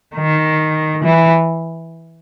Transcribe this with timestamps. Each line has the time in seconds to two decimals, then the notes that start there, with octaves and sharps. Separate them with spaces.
0.16 D#3
1.04 E3